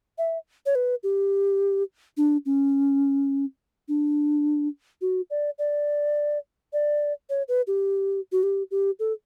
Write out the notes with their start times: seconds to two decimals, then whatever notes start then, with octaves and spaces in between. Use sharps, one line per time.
0.18 E5
0.66 C#5
0.75 B4
1.03 G4
2.17 D4
2.46 C#4
3.88 D4
5.02 F#4
5.30 D5
5.59 D5
6.73 D5
7.30 C#5
7.48 B4
7.67 G4
8.32 F#4
8.43 G4
8.71 G4
8.99 A4